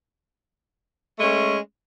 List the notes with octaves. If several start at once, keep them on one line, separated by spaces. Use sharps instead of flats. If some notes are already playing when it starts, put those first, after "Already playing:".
G#3 A3 C#4